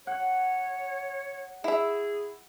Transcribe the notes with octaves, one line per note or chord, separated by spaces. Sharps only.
C#5 F#5
E4 G#4 E5